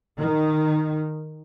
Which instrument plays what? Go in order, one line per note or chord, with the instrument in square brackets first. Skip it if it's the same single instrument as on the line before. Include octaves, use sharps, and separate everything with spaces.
[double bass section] D#3